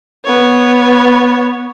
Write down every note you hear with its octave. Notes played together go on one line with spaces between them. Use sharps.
B3 C#5